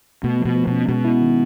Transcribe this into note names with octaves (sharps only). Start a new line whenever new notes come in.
B2 A3
B2 F3
F3
B2 C#4
B2 G#3
E4
D#3